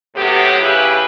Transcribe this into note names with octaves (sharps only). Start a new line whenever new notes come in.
A2 C3 F#3 B3 G4
C#3 E4 G4 G#4 B4